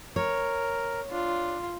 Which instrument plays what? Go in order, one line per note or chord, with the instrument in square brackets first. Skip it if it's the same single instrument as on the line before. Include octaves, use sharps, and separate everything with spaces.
[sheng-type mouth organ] A#4 [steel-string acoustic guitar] C#5
[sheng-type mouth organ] D4 [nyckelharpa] F4